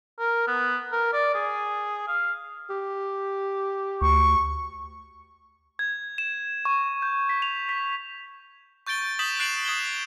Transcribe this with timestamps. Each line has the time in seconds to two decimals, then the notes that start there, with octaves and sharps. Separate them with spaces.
0.19 A#4
0.47 B3
0.92 A#4
1.13 D5
1.34 G#4
2.08 F5
2.70 G4
4.01 D2 C#6
5.79 G#6
6.18 E7
6.65 C#6
7.02 G6
7.29 B6
7.42 F7
7.69 B6
8.87 C#6 G6 A6 D7 G7
9.19 D#6 G6 B6 E7 F#7
9.39 F#6 A6 C7 D7 E7 F#7
9.65 D#6 G#6 E7 G7